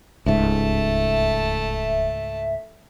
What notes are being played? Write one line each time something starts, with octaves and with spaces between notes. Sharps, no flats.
D1 C#2 G#2 A3 E5 A5